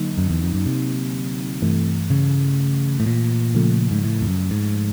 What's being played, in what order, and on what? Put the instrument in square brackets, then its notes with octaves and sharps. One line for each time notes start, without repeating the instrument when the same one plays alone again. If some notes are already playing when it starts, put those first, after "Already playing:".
Already playing: [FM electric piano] D3 F#3 A#3 D#4
[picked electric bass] F#2
E2
F2
F#2
C3
[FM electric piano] G2 E3 A3
[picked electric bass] C#3
A2
A#2
[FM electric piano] C#3 F3 A3
[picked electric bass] G#2
A2
F2
F#2
G#2